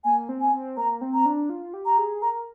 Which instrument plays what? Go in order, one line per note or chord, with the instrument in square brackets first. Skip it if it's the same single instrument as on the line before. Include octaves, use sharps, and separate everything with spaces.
[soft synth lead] A#3 [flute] G#5
[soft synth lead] C4
[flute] G#5
[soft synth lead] C4
[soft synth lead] A#3 [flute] A#5
[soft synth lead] C4
[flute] A#5
[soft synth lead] D4
F4
G4
[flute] A#5
[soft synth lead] G#4
[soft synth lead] A#4 [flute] A#5